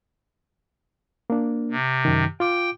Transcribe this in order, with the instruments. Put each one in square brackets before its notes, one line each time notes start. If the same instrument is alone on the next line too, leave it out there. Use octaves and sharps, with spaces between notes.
[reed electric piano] A#3 D4
[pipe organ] C3
[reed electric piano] F#2 D#3
[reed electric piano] F4 D6 [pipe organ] G5